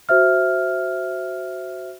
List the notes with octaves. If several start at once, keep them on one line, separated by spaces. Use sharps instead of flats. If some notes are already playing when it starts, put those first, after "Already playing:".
F#4 C5 E5 F6